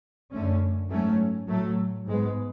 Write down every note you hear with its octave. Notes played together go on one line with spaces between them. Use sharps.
F#2 D3 A3 C#4
G#2 F#3 A3 C#4
A2 F#3 A3
G#2 G#3 B3